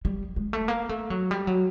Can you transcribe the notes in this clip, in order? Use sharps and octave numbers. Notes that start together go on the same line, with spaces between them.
G3
G#3
A3
A#3
A3
F#3
G3
F#3